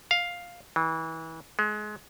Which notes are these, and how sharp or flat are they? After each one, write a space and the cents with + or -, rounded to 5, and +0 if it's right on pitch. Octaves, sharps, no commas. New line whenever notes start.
F5 +5
E3 -30
G#3 +25